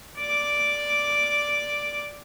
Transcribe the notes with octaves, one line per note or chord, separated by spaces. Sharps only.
D5 D6